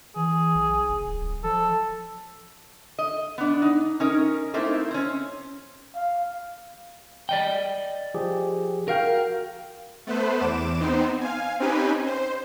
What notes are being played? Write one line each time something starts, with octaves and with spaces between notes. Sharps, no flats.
E3 G#4
B1
F#1
D1
F3 A4
D#5
B3 D4
D#4
C#4 D#4 A#4
A3 A#3 C4 D#4 E4
C4 C#4
F5
D5 D#5 G5
F3 G4 G#4
F#4 A#4 F5 G5
A3 B3 B4 C5
E2 D6 E7
B3 C4 D#4 C5
F5 G#5
C4 C#4 D#4 G4 B4 G#5
C5